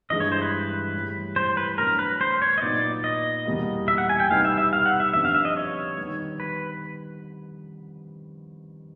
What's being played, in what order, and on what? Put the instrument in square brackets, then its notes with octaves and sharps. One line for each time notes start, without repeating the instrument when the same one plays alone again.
[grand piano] G2 E3 G#3 [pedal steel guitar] D#5
[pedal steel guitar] C#5
C5
B4
[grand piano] A2 E3 G3
[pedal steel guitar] C5
B4
[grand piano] A2 F#3 B3 D4 [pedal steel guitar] A#4
[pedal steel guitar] B4
C5
C#5
D#5
[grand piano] A#2 F#3 B3 D#4 [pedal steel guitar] D5
[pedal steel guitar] D#5
[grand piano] E2 B2 G3 A#3
[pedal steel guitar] E5
F#5
G#5
G5
[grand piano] C2 B2 G3 B3 D#4 [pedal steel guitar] F5
[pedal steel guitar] E5
E5
F5
F#5
E5
[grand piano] F2 D3 G3 B3 D4 [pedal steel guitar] E5
[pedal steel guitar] F5
E5
D#5
C#5
[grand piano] D#3 G3 B3
[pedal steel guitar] B4